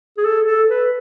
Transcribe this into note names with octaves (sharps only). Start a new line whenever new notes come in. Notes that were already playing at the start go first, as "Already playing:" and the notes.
G#4
A4
A4
B4